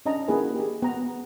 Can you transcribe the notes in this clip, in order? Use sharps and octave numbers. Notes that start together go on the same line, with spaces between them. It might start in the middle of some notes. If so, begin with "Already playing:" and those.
C#4 D4 D#5 A5 A#5
A#3 E4 F#4 G#4 B4
G4 G#4
B3 A#5